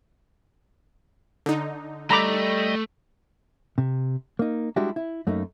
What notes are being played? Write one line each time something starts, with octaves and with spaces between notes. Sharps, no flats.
D3 D#4
G3 A3 D#5 A#5 B5 D6
C3
A#3 D#4
G3 G#3 D4 E4 F#4 G4
E4
F#2 A3 A#3 D#4